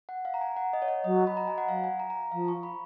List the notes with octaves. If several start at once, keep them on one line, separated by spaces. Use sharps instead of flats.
F#5
F5
A#5
G#5
F#5
D#5
C#5
D#5
F#3 D#5
B5
A#5
G#5
F#5
F#3 F5
G#5
A#5
A#5
F3 F5
C#6
B5